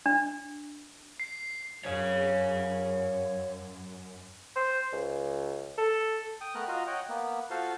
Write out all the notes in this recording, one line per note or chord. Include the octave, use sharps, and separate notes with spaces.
D4
C7
F#2 C#5 F5
C5
C#2
A4
G5 D#6
A3 B3 A#4 F6 F#6
F4 F#4 D#5 A#5
C#5 D#5 F#5 G5
A#3 B3
F4 F#4 A4 C5 F5